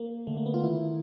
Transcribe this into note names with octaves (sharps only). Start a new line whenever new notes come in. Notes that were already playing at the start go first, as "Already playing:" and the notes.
Already playing: A#3
D3 A3
A#3
B3
F4
D#3 E4